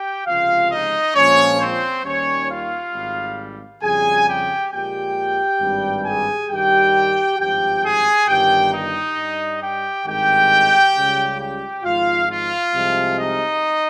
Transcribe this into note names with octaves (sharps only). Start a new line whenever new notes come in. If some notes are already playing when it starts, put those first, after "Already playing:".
Already playing: G4 G5
C#2 C3 F3 G#3 F4 F5
D#4 D#5
A#1 A#2 F3 G#3 C#4 C#5
C4 C5
D#2 D#3 G3 C#4 C#5
F4 F5
G#1 G#2 G3
F2 C#3 G3 G#4 G#5
G4 G5
A#1 A#2 G#3 G4 G5
G#1 G2 G3
G#4 G#5
G2 D#3 G3 G4 G5
G#1 G2 F3 G4 G5
G#4 G#5
G1 G2 D#3 G4 G5
D#4 D#5
G2
G3
G4 G5
G#1 G2 D#3 G#3 G4 G5
C#2 C#3 G3
G4 G5
G#1 G#2 F3 F4 F5
F4 F5
C2 C3 F3 G#3
D#4 D#5